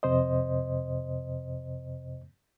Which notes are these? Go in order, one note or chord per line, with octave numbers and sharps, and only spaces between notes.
F2 C3 C5 D#5